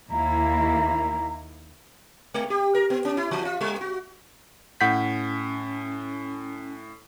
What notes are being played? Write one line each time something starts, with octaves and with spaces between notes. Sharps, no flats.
D#2 A#3 E4 A#5
G#3
G4
A#4
B3
C#4
E4
E3
F4
G3
F#4
A2 C#4 F#5 G6 B6